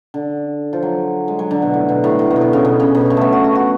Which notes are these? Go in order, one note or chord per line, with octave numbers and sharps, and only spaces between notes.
D3
F3
F#3
G#3
F#3
D3
B2
A2
B2
A2
A2
B2
A2
B2
C#3
B2
C#3
B2
C#3
A3 B3
F#4
F#4
F#4